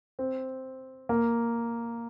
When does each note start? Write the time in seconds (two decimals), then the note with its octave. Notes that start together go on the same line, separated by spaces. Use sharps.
0.19 C4
1.09 A#3